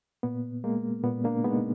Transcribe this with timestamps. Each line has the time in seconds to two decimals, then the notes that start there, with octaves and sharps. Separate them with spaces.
0.23 A#2 B3
0.64 G#3 A#3
1.04 A#2 B3
1.24 A#3 D4
1.44 G#3 B3 D#4